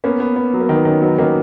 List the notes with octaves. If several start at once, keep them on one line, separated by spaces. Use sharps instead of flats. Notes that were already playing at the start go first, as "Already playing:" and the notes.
A#3 B3 C#4
B3
B3
F#3
A#3
D#3 B3
D#3 C#4
F#3 B3 D#4
D#3 A#3 C#4